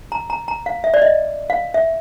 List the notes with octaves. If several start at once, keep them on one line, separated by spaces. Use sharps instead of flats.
A#5
A#5
A#5
F5
E5
D5
D#5
F5
E5